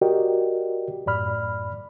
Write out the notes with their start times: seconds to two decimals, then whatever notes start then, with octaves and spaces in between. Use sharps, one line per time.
0.01 F#4 G4 A#4 D5 D#5 G5
1.06 F#2 A2 D5 B5 F6